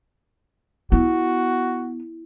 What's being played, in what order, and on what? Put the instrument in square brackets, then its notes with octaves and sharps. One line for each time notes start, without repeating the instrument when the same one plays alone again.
[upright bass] B3 [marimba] E4 [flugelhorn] F#4